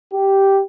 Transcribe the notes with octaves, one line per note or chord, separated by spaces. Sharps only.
G4